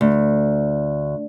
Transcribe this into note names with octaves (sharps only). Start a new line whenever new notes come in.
D2